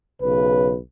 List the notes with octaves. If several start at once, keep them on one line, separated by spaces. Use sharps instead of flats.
B1 C#3 B4